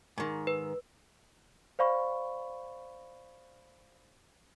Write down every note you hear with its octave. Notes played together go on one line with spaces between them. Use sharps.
G#2 D#3
B4
C5 D5 F5 B5 C#6